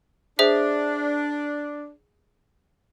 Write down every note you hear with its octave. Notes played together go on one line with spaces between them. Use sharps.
D4 G#4 C5 E5